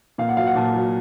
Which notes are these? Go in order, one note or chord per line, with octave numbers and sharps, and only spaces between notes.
A#2 F5
F#5
F#3 F5
F#5
A#2 A5
F#3